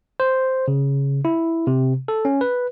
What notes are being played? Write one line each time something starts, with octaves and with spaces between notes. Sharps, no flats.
C5
C#3
E4
C3
A4
C#4
B4